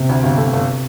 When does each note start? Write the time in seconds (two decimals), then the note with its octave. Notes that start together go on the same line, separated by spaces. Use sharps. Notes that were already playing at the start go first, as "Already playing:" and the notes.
Already playing: C3
0.09 D2
0.23 G1
0.38 A3
0.53 G1